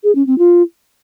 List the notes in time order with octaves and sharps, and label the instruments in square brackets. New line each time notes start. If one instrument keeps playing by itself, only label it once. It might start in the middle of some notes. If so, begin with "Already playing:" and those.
[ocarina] G#4
C#4
C4
F4